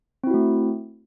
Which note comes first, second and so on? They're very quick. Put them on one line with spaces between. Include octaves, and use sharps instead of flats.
C4 E4 F#4 A3